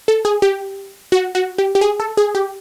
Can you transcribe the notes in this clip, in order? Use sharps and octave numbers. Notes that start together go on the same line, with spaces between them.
A4
G#4
G4
F#4
F#4
G4
G4
G#4
A4
G#4
G4